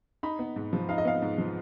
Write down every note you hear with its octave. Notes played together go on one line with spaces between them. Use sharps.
D#4 B5
B3
G#2
F3
D#4 F5
D#5
B3 F5
G#2
F3